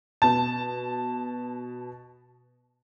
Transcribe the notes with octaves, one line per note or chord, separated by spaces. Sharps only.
B2 A5